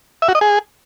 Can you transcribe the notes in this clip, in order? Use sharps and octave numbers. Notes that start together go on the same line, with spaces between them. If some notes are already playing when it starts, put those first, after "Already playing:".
E5
F#4
D#5
G#4